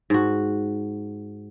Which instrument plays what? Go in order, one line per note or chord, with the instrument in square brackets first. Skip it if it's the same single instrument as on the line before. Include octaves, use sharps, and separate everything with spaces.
[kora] G#2 F#4